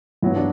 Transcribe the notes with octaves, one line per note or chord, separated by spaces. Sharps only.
G2 F#3 B3 E4
D4